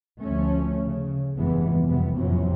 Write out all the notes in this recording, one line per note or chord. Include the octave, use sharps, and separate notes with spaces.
D2 F3 A3 C#4
C#3
F1 E2 G2 E3 G#3 B3
G1 F2 C3 B3
A1 F2 C3 E3 F#3 C#4